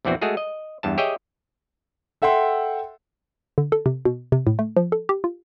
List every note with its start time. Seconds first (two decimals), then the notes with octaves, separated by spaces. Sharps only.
0.05 A#1 E2 E3 C4 F#4
0.21 G#3 A3 F#4 G#4 A4
0.37 D#5
0.83 E2 G2 A5
0.98 G4 G#4 C#5 D#5 E5 G5
2.22 A4 E5 F#5 G5 C6
3.58 D3
3.72 A4
3.86 C3
4.05 B2
4.32 C3
4.47 A2
4.59 A3
4.77 F3
4.92 A4
5.09 G4
5.24 F4